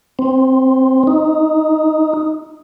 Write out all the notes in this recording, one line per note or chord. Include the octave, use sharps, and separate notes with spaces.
C4
D#4